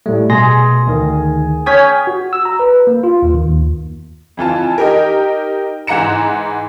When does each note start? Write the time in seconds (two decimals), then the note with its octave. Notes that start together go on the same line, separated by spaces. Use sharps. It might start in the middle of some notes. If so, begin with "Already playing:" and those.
0.06 A2 G3 A3
0.30 B2 G#4 C6 A#6
0.87 D2 D#3
1.66 C#4 C#5 G5 D#6 G#6 B6
2.07 F#4
2.33 E6
2.45 A#5
2.59 B4
2.87 A#3
3.03 F4
3.22 D#2
3.34 D#3
3.49 D#2
4.37 F2 E3 F4 A5
4.78 D#4 G4 A#4
5.87 G#2 E3 F#5 A#5 C#7 E7